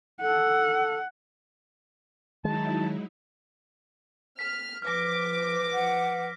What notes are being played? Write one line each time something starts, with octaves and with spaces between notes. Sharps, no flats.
A4 F#5
D#3 F#3 G#3 D#4 E4 A5
F6 B6
F3 B4 D6 F6 A#6
F#5